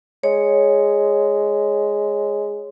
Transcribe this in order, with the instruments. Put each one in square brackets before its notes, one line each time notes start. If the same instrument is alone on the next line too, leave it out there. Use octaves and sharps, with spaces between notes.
[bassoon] G#3 [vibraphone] C#5